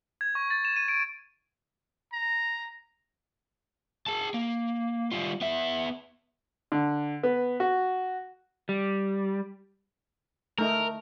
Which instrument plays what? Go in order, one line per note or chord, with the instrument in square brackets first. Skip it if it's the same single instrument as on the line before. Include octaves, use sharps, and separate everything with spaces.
[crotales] G#6
C#6
A6
E7
D#7
D7
[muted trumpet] A#5
[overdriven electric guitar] G#4 A5
A#3
G3 F4
B3 E5
[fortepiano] D3
B3
F#4
[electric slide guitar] G3
[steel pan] A3 D#4 [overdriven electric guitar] A#4